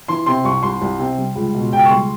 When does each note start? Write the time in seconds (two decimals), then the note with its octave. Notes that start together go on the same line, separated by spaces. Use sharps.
0.08 E3 C6
0.26 C3 C6
0.45 C2 C#6
0.63 C2 C6
0.82 C2
0.99 C3
1.18 G3
1.36 C#2
1.54 B2
1.73 C#2 G5
1.86 C#6
1.90 G3 C6